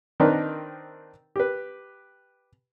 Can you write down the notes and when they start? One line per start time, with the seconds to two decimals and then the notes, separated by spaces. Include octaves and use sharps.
0.20 D#3 C4 D4 D#4 A#4 B4
1.36 G4 B4